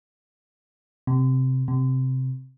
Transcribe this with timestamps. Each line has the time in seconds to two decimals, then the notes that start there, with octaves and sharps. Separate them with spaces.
1.07 C3
1.68 C3